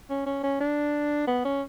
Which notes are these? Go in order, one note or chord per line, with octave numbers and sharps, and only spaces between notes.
C#4
C#4
C#4
D4
B3
C#4